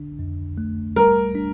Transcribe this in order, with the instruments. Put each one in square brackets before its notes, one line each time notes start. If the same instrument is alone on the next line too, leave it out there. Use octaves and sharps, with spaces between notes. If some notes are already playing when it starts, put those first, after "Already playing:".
Already playing: [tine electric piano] D3 D4
F2
A3
[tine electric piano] G3 [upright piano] A#4
[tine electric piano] D4